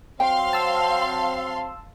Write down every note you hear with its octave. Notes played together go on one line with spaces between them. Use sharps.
F#3 C4 F5 G5 C6
A5 E6